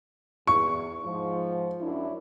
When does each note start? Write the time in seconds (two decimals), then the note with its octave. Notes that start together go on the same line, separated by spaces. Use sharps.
0.47 E2 C#6
1.04 G#2 F3
1.81 F#2 D4 E4